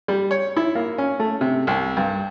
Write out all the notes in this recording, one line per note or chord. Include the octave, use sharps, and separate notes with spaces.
G3
C#5
E4
A#3
C#4
A3
C3
C2
G2